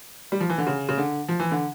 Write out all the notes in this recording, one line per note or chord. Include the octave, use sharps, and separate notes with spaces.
G3
F3
E3
D3
C#3
C#3
D3
F3
E3
D3